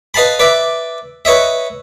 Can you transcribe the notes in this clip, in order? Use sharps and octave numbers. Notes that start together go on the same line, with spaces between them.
B4 D#5 F5 A5 B5
B4 D5 E5
B4 C#5 D#5 E5